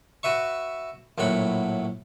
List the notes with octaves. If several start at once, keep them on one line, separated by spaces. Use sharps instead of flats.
F#4 B4 E5 C#6
A#1 A2 F#3 F#5 B5